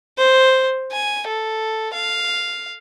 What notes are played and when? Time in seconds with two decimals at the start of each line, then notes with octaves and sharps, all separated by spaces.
0.18 C5
0.92 G#5
1.28 A4
1.93 F5